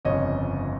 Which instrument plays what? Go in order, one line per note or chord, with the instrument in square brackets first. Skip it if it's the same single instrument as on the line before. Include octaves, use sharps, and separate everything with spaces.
[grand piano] G1 F2 C#3 C#5 D#5